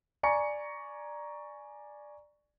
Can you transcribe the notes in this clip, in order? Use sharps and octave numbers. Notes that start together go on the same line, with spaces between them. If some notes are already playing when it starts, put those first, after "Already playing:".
D5 G#5 A#5 C#6 C#7